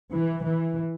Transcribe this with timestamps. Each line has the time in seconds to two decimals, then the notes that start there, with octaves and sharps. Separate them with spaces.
0.12 E3
0.44 E3